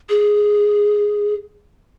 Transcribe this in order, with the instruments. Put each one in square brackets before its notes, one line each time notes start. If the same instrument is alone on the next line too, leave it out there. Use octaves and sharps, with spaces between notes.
[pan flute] G#4